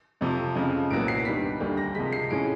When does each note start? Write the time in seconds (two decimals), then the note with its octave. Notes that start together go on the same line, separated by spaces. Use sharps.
0.21 F2 C3 F3
0.55 F2 C#3 F3 G#3
0.90 C2 A#2 F#3 B3 D7
1.08 C7
1.25 G2 D#3 G3 B3 B6
1.60 D2 D3 G3 A#3
1.77 A#6
1.95 C3 F3 G#3 B6
2.13 C7
2.30 A2 F3 G#3 C#4 D7